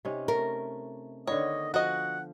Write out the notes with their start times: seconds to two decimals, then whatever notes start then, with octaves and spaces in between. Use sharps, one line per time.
0.05 C3 C#4 D#4
0.28 A3 A#4
1.27 D3 D#3 B3 C#5 D#5
1.74 F3 F#4 D#5 F#5